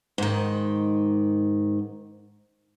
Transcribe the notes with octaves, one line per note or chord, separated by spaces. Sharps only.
G#2 D#3